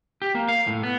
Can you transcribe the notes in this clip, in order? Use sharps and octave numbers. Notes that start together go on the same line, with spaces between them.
G4
A#3
F5
A2
B3